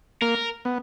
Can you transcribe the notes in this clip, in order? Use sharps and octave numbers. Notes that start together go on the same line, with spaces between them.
A#3 A#4
B3